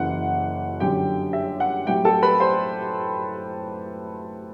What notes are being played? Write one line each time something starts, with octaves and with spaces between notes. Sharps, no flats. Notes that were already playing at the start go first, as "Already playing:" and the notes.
Already playing: F#1 F#2 E3 F#5
G1 F#2 D3 F#3 G4 G5
E5
F#5
A2 F#3 C4 E4 G4 G5
A4 A5
B4 B5
C5 C6